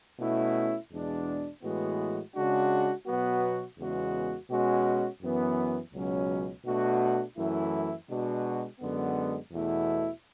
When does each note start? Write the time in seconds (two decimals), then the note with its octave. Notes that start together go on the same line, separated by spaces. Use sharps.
0.19 B2 A3 C#4 E4
0.91 E2 B2 G#3 D4
1.62 A2 E3 G#3 B3 F#4
2.35 C#3 G#3 D4 F#4
3.06 B2 F#3 B3 F#4
3.78 E2 C#3 G#3 B3 F#4
4.50 B2 G#3 C#4 F#4
5.21 F#2 E3 B3
5.93 C#2 B2 F#3 C#4
6.65 B2 A3 D4 F#4
7.36 F#2 E3 A3 E4
8.09 B2 G#3 D4 F#4
8.80 F#2 D3 G#3 B3
9.51 E2 B2 A3 E4